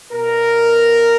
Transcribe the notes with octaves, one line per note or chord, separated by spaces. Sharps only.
B2 A#4